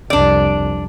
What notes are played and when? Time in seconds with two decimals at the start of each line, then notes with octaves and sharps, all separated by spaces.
0.10 C2 F2 D4 D5